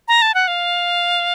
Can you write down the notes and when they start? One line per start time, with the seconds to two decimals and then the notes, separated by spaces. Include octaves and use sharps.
0.08 A#5
0.22 A5
0.35 F#5
0.48 F5